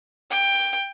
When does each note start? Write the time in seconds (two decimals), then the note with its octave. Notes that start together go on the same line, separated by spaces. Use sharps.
0.31 G5